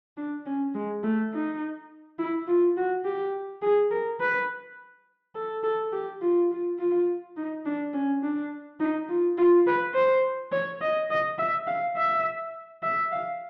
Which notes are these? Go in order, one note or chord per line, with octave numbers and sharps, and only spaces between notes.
D4
C#4
G#3
A3
D#4
E4
F4
F#4
G4
G#4
A#4
B4
A4
A4
G4
F4
F4
F4
D#4
D4
C#4
D4
D#4
F4
F4
B4
C5
C#5
D#5
D#5
E5
F5
E5
E5
F5